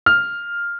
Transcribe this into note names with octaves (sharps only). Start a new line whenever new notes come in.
F6